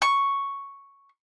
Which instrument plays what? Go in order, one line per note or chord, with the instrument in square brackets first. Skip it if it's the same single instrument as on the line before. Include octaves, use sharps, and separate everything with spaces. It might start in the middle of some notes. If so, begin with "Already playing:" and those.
[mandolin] C#6